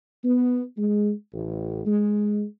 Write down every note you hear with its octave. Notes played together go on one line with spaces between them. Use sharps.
B3
G#3
A1
G#3